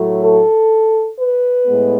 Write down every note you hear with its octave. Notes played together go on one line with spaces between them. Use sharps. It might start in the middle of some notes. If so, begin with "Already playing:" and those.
Already playing: A2 F#3 A3
A4
B4
A2 G#3 B3